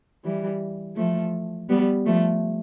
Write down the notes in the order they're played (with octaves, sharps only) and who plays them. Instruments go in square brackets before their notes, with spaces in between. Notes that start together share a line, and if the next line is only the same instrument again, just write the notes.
[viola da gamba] E3 G3
F3 A3
G3 B3
F3 A3